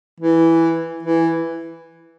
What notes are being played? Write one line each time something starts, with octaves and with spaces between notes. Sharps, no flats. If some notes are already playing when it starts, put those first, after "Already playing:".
E3
E3